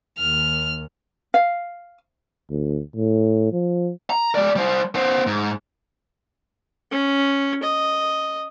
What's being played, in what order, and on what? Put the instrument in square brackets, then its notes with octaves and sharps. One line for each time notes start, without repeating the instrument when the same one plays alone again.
[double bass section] D#2 [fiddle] F6
[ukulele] F5
[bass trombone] D2
A2
F3
[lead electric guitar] A#5
G#3 D5
G3 C5
B3 C5
G#2
[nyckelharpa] C#4
D#5